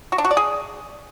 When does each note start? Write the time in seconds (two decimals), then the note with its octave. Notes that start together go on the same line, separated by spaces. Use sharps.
0.12 F#4
0.18 D4
0.25 F#4
0.31 D5
0.37 G#4